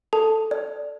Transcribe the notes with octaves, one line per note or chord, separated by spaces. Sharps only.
A4 A5
D5